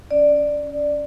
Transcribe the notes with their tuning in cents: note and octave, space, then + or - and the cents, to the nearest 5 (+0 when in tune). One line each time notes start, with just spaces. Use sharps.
C#4 +0 D5 +5